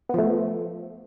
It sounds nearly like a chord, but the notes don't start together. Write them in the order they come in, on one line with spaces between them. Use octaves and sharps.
B3 F3 A3